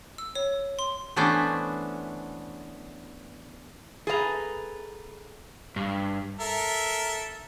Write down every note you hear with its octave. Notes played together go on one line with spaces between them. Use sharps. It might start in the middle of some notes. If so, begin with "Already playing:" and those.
E6
C#5
C6
E3 A3 B3 C#4 D4 C5
G#4 A4 B4 E5 A#5
G2
A4 A#4 E5